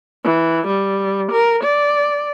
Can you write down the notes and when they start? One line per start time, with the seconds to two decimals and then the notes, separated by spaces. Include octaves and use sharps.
0.24 E3
0.68 G3
1.32 A#4
1.64 D5